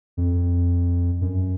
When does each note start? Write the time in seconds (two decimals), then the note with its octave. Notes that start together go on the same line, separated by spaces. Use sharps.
0.17 F2
1.21 F#2